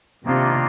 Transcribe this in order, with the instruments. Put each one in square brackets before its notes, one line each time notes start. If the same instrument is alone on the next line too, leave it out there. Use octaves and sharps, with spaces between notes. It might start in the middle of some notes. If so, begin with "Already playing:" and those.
[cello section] C3 [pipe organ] D#3 A#3 D4 F4